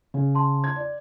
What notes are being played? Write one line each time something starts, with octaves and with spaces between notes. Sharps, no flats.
C#3
A5 C6
G#6
D5